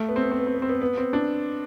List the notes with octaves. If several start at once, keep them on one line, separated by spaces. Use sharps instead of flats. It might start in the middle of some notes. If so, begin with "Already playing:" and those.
Already playing: A3
B3
C4
B3
C4
B3
C4
B3
C4
B3
B3
C4
D4